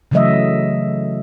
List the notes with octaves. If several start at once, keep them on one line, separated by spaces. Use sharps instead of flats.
C#3 E3 F#3 A3 D#5 E5